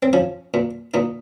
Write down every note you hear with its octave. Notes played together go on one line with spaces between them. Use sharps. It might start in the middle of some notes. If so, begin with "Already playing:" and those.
C4
F3 C#4
A#2
A#2 D#4